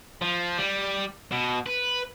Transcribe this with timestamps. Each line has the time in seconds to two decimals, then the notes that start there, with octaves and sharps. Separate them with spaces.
0.22 F3
0.58 G3
1.32 B2
1.66 B4